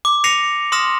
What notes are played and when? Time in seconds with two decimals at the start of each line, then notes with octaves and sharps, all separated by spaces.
0.05 D6
0.24 A#6 C7 C#7 D#7 F7
0.72 C6 D#6 F6 A#6 E7